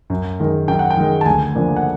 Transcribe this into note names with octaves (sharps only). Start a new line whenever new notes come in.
F#2
D#3 G#3
F#2 G5
F#5
G5
D#3 G#3
A5
D2 G#5
C#3 F3 A#3 D4
F#5